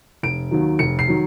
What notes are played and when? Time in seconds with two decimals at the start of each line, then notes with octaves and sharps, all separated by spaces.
0.23 F1 D7
0.51 D#2 D#3 F#3
0.79 F1 C#7
0.99 C7
1.08 D#3 F#3